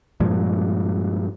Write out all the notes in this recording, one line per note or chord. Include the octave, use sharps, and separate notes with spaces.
G2 A#2 F3 G#3